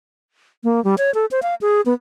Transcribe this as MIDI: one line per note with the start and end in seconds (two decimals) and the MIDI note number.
0.64 0.83 58
0.84 0.95 55
0.98 1.13 73
1.14 1.26 69
1.31 1.40 72
1.43 1.55 77
1.61 1.81 68
1.86 1.94 59